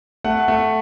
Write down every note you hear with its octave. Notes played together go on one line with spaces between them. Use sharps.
A3 F#5
A3